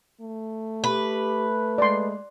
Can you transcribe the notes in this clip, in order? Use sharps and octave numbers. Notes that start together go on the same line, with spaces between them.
A3
G4 B4
G#3 D5 C6